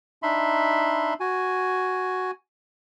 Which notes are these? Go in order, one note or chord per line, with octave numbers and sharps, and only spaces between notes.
D4 D#4 E5 B5 C6
F#4 G#5